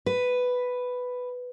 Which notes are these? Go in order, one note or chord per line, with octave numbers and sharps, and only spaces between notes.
B4